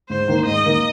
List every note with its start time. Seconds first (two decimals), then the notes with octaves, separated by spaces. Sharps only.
0.09 G#2 C5
0.28 D#3 A#3 D#4 A#4
0.46 G#2 D#5
0.65 D#3 A#3 D#4 A#4